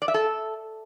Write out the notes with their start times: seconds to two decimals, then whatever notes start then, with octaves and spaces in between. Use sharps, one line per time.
0.02 D5
0.08 E5
0.14 A4